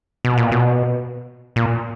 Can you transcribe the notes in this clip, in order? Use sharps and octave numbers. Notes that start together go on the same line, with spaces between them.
B2
A#2
B2
A#2